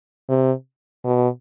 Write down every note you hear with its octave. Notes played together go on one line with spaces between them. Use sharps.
C3
B2